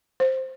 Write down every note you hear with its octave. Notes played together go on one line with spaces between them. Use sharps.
C5